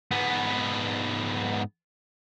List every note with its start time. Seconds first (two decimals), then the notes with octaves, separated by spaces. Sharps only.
0.11 G#2 B3